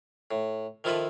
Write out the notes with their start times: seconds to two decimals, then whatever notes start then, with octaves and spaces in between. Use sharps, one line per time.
0.31 A2
0.84 D#3 F3 E4 F4 A4 B4